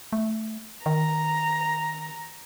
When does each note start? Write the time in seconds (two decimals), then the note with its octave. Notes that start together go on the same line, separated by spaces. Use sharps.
0.13 A3
0.86 D#3 A#5